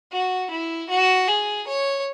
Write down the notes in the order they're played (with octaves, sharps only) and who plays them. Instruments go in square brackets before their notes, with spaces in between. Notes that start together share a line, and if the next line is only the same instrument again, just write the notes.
[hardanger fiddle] F#4
E4
F#4
G#4
C#5